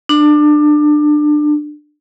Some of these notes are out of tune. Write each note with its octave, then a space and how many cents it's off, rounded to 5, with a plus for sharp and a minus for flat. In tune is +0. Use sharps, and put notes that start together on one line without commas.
D4 +25